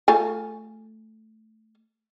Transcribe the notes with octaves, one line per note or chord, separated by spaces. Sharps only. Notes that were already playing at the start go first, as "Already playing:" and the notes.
A3 F4 G#5